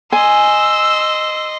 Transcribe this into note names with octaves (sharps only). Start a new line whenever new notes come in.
D#5 G#5 C6 E6